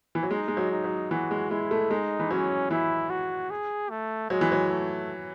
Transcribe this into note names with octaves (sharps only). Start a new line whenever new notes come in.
E3
F#3
G#3 D#4
G#3
F#3
D#4
F#3
E3 F#4
G#3
G#3 E4
A3
G#3 D#4
E3
F#3 C#4
E3 E4
F#4
G#4
A3
F#3 G#3
E3
F#3
A3